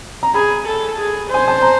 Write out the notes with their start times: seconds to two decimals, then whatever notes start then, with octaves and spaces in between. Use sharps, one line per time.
0.23 A#5
0.34 G#4 B5
0.67 A4
0.98 G#4
1.30 C5 G#5
1.48 A5
1.62 A#5